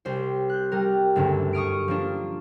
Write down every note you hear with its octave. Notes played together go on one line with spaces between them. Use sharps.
C2 C5
F#6 G6
G3 A#4
F#1 D2 G2 D3
C#6 D#6 F6 D7
F3 A#3 D4